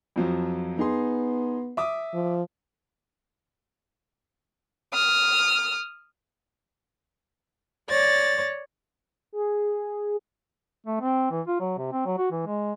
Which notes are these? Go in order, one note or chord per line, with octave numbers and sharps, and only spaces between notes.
F2 F3 F#3
B3 D#4 G#4 C6
E5 D6 D#6
F3
D#6 F6
C#5 D5 A6 A#6
G#4
A3
C4
E3
F4
F#3
C3
C4
F#3
F#4
E3
G#3